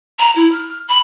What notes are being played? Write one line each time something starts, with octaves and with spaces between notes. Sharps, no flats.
A#5
E4
F6
B5